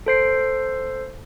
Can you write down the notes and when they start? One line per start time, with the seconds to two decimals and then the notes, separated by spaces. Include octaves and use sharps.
0.06 A4 C5 C7